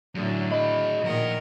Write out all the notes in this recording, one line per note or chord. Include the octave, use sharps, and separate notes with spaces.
F#2 A2 D3 F#3
G#4 D#5 B5
A#2 D#3 F3 A#4 F#5